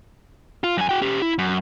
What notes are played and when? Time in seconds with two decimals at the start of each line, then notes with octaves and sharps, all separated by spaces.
0.64 F4
0.77 F#2 G#5
0.89 F#4 G5
1.02 C#4 G4
1.22 E4
1.38 F#2